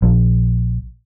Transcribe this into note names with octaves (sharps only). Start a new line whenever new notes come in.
A#1